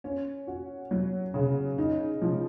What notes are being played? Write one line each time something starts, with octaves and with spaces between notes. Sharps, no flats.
C#4
F#4
F#3
C#3
D#4
F3